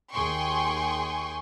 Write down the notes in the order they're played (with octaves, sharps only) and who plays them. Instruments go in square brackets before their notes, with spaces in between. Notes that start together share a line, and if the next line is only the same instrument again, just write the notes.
[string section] D#2 G#4 G5 G#5 C6 C#6